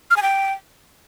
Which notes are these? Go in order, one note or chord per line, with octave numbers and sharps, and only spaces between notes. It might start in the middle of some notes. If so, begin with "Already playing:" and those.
F6
G#5
G5